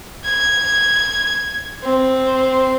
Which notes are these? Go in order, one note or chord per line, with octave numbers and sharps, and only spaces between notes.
G#6
C4